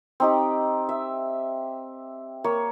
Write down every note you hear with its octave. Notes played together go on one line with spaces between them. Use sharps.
C4 D#4 G4
E5
A#3 C#5